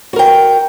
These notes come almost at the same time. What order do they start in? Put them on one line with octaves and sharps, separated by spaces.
F#4 A#4 G5